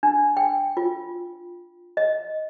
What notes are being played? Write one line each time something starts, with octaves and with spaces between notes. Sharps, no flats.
D4
G5
F4
D#5